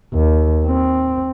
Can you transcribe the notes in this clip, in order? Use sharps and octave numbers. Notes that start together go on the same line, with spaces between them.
D#2
C4